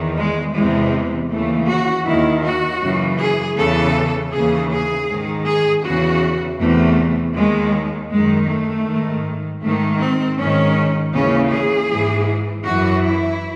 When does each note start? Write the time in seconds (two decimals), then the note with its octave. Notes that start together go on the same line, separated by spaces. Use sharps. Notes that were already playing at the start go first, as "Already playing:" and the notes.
Already playing: E2 D#3
0.17 G#3
0.55 E2 C3 E3 G#3
1.31 D#2 C#3 E3 A3
1.68 F#4
2.05 D#2 D#3 E4
2.44 F#4
2.82 F#2 C#3 E3
3.20 G#4
3.57 E2 C#3 E3 A4
4.32 D#2 C#3 E3 G#4
4.71 G#4
5.09 G#2 D#3
5.46 G#4
5.84 E2 C#3 E3 F#4
6.59 E2 C3 E3 A3
7.35 D#2 D#3 G#3
8.11 F#2 D#3 G#3
8.49 A3
8.86 G#2 D#3
9.62 G#2 D#3 A3
10.00 C4
10.39 G#2 D#3 C#4
11.14 D#2 C#3 E3 C#4
11.51 G#4
11.89 G#2 E3
12.65 F#2 E3 F#4
13.03 E4